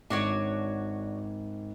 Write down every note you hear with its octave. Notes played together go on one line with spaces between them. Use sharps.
G#1 D4 F#4 C#5